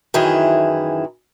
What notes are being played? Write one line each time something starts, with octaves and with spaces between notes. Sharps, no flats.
F#2 D#3 E3 E4 G#4